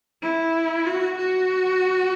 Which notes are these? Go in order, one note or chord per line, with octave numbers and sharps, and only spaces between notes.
E4
F#4
F#4